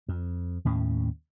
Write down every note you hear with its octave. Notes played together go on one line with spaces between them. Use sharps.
F2
D#2 A2 C#4